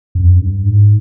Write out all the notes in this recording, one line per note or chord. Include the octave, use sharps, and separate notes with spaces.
F#2
F2
F#2
G2
G#2